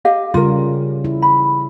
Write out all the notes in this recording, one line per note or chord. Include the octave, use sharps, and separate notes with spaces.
G4 D#5 F5
C#3 G3 F4 A#4
E4
B5